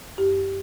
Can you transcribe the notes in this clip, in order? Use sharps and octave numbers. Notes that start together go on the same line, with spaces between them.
F#2 G4